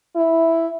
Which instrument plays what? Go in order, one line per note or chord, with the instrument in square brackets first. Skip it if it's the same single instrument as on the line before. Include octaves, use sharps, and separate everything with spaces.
[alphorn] E4